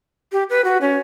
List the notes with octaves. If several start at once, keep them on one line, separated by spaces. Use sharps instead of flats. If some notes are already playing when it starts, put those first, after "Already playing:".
G4
B4
F#4
C#4